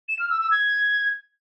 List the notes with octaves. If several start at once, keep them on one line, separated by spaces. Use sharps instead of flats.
E7
F6
E6
E6
G#6